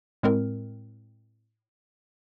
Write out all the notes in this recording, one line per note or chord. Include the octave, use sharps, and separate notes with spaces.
A2 G#3 C4 A#4